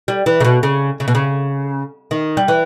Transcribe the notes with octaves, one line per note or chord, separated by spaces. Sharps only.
G3
E3
C#3
B2
C#3
C#3
B2
C#3
D#3
G3
E3